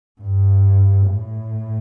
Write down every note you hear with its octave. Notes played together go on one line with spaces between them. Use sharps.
G2
A2